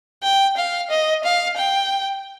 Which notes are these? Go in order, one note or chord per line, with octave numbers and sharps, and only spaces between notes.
G5
F5
D#5
F5
G5